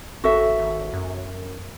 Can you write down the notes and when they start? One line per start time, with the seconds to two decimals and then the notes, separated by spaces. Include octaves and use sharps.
0.24 A1 F#4 A4 E5
0.59 G#1
0.93 F#2